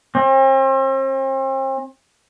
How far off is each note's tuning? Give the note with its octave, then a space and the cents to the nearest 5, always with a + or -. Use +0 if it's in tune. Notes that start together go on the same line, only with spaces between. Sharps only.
C4 +40